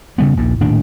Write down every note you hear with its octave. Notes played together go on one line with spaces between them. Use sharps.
C#3 G3 B3
A#1 D#2 A#2
D#1 A2 D#3 D4